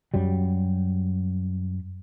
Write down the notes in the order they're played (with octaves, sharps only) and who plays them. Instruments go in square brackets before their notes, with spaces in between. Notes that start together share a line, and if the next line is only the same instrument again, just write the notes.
[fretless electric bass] F#2 F#3 G3